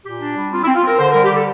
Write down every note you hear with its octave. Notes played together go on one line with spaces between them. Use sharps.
A#2 G4
D4
G3
C4 F4
E4
C4
F4
C4 A#4
D3 C5
A#4
G3
G4
D3 A4